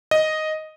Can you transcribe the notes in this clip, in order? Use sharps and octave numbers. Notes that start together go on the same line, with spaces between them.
D#5